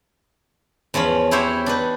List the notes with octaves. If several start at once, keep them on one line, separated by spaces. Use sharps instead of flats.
E2 F3 C#4 B5
E4 F#4 G4 C5 C#5 E5
D4 D#4 B4